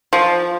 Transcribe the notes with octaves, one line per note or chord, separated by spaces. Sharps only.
F3